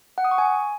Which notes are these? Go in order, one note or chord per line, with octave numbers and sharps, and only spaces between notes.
F#5
D#6
C#6
G#5